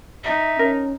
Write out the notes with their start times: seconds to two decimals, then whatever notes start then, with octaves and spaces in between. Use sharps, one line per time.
0.24 D#4 E5
0.59 C#4 A#4